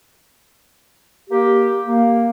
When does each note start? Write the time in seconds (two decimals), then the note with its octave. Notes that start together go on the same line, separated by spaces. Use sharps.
1.30 A#3 G4
1.87 A#3